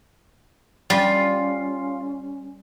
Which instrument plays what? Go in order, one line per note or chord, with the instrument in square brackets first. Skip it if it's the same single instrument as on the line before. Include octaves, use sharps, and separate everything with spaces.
[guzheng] G3 [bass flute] C#4 [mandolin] F4